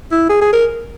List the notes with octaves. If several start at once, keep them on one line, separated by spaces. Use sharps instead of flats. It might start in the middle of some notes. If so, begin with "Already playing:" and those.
E4
G#4
G#4
A#4